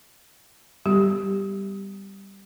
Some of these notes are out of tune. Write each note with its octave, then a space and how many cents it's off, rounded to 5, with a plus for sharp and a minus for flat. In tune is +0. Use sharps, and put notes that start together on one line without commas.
G3 +0 B3 +25 G4 +0